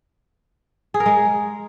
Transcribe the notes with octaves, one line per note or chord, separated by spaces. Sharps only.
G#4
A#4
G#3